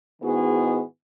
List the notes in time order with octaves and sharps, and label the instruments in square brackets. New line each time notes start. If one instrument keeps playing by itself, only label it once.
[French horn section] G#2 D#3 B3 E4 F#4 G#4